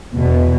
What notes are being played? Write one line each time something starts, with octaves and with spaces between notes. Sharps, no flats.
E2 B2